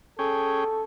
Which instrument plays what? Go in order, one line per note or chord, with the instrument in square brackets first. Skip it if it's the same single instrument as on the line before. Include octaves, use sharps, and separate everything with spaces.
[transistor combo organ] C#4 G#4 G5 [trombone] A4